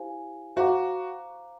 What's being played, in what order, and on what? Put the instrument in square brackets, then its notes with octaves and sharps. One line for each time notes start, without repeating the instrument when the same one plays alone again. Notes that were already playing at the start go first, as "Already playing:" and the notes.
Already playing: [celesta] E4 G4 C5 F5 G#5
[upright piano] F#4 [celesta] C5 F5 A#5 D6